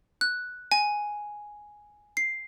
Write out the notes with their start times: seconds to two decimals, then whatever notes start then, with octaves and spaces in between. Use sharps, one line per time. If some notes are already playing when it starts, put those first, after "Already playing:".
0.21 F#6
0.72 G#5
2.17 C7